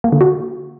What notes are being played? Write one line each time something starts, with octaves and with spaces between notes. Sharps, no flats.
A#3
D3
F#4